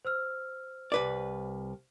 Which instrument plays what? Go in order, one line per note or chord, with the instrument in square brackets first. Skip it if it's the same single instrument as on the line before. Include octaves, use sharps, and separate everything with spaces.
[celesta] C5 E6 F6
[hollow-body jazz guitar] C2 B4 D5